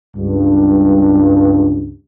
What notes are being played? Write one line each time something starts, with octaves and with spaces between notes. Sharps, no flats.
C#2 G2